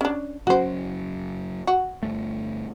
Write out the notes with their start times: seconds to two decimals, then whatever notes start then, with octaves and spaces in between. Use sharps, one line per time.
0.01 C#4 D4
0.47 F#1 F#3 C#4 F#4 C5
1.67 F#4
2.03 G1 F2 A3